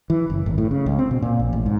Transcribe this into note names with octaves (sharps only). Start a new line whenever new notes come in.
E3
F#1
G#1
A2
C#3
C#2
C4
B2
A#2
A#1
A1
G#2